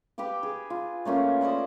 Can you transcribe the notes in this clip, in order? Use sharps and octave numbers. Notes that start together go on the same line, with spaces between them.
G4 B4 F5 G5
G#4
F4
A3 A#3 C#4 F4
C5 D5 D#5 B5